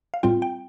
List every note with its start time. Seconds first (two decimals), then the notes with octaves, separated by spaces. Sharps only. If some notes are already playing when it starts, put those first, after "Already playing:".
0.14 F5
0.23 A2 G3 C4 F4 G5
0.42 G5